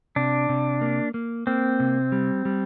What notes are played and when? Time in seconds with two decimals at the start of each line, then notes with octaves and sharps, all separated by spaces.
0.16 C3 D4
0.49 C3
0.81 A#3
1.14 A#3
1.47 A#3 C4
1.80 C3
2.12 G3
2.45 G3